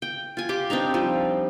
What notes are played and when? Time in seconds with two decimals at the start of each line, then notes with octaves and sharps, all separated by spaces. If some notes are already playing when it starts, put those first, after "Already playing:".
0.02 G5
0.37 F4 G#5
0.49 G4 C6 D6
0.70 C4 D4 D#4 A#5
0.94 F3 G3